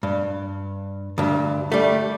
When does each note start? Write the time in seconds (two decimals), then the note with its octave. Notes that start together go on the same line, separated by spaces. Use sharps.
0.03 G2
1.18 D2 G2
1.72 G3 A3